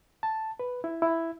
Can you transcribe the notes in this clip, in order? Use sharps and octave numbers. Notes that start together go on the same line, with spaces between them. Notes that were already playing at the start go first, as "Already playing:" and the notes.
A5
B4
E4
E4